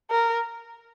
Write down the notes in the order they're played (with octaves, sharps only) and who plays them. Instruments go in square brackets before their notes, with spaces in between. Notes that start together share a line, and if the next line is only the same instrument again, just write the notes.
[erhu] A#4